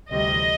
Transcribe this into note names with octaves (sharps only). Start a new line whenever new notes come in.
D2 C3 E3 G3 D#5